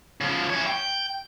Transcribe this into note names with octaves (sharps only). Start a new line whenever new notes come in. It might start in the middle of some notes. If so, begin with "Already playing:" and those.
C#3 F3
E3 C#5
G5